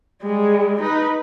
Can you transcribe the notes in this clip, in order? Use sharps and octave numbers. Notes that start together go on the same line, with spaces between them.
G3 G#3
D#4 B4